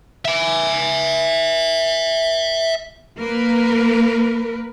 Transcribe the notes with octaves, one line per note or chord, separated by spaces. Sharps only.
E5 G#5
A#3 A#4 B4